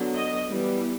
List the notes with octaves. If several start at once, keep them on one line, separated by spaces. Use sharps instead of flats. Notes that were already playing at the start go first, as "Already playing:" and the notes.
Already playing: D3 F#3 B3
D#5
E3 G3 B3